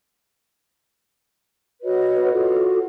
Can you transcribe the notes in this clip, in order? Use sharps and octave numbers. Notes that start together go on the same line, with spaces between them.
F#4 B4 C#5 D#5
F4 F#4 A4